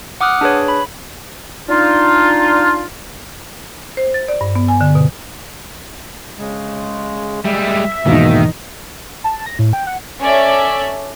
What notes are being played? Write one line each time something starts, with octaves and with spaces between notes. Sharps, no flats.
F#5 D6 D#6 F6 F#6
D4 G#4 B4 C#5
B5
D4 D#4 F4
C5
A6
D5
G2
B3
G#5
D3
B2
C#3 G#3
G3 G#3 E5
E2 G#2 B2 D#3 A#3 D#4
A5
A#6
A2
G5
F#5
C#4 A4 C#5 D5 E5